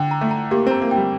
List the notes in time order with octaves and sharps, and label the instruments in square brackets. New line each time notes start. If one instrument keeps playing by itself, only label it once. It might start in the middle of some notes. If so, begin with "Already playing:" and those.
Already playing: [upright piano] D3 [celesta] G5
[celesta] A#5
[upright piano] A3
[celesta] A#5
[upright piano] A#3 [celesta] G4
[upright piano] C4 [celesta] A#5
[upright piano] A#3
[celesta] G5
[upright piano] G3